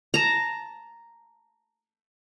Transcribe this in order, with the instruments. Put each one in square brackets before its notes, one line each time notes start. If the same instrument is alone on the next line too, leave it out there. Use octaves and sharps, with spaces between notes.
[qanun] A5 A#5